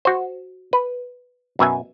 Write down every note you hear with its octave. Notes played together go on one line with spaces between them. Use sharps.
F#4 C5
B4
F#2 B2 E5 G#5